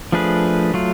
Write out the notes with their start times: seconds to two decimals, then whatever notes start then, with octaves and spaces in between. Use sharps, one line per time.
0.12 F3 A3 D4 G#4 B4
0.74 F#3 A3 F4